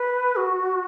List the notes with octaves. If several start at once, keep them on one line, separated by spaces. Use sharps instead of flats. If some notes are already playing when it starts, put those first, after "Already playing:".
Already playing: B4
F#4